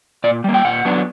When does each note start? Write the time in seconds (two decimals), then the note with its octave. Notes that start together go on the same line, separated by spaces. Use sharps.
0.24 A#2 D5
0.44 G3 A#3
0.54 G5
0.65 A#2 F#5
0.85 F#3 B3 D4